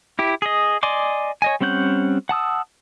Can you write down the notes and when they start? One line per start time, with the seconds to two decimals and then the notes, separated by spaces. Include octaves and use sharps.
0.19 E4 G4
0.42 G#4 D#5
0.83 D5 D#5 G#5 C6 D6
1.42 C#5 D#5 G#5
1.61 G3 C4 C#4 F#5 G6
2.29 F#5 A5 D#6 E6